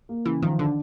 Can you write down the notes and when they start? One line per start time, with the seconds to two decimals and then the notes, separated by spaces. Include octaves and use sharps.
0.09 A#3
0.26 C#3 E3
0.42 D#3 F3
0.59 D3 D4